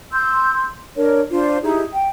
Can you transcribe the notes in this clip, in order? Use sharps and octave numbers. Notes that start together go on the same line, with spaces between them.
C6 E6 G6
D4 A#4 C#5
D4 F4 C5
D#4 E4 G4 G#4
G5